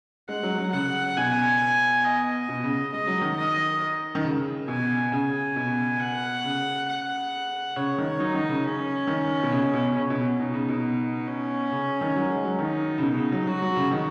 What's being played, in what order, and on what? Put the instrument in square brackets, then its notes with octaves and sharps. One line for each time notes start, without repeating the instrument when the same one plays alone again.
[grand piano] G#3 [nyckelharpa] F#5
[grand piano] F#3
F#3
[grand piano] C#3 [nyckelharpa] F#5
[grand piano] B2 [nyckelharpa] G#5
[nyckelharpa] D#5
[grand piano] B2
C#3
[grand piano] G#3 [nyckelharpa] D#5
[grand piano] F#3
D#3
[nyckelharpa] D#5
[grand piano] D#3
C#3
[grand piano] B2 [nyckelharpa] G#5
[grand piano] C#3 [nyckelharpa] G#5
[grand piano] B2
[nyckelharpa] F#5
[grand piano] C#3
[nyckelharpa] F#5
[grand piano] C#3 [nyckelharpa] C#5
[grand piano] D#3
[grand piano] F#3 [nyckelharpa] D#4
[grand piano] D#3
C#3
[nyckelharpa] C#4
[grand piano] D#3
B2
C#3
B2
B2
B2
[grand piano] C#3 [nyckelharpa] C#4
[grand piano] B2
[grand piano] B2 [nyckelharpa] D#4
[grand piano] C#3
B2
[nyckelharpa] C#4
[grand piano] C#3
D#3
F#3
G#3
F#3
[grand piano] D#3 [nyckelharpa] D#4
[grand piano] C#3
B2
C#3
F#3
[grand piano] F#3 [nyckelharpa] F#4
[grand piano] F#3
C#3
D#3